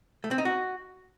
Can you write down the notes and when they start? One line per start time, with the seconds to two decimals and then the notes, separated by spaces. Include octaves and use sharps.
0.24 A3
0.31 C4
0.38 D#4
0.45 F#4